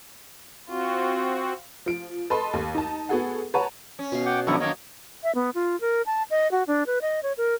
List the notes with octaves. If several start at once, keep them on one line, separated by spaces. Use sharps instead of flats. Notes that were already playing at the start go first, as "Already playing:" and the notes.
C4 F4 F#4
F3 D7
A4 B4 D#5 A5 B5 C6
D#2
D#4 A5
B3 F#4 G#4 A4 F#5
B4 C#5 F#5 A5 A#5
C#4
B2 F5
F#5 G5 D6
F#2 D3 F3 B3 E4 A4 A#5 C#6
F#2 D#3 A#3 C#5 D#5
E5
B3
F4
A#4
A5
D#5
F#4
D4
B4
D#5
C#5
A#4